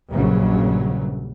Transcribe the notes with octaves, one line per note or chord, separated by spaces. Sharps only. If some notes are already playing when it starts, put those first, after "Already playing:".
A#1 G2 C#3 F#3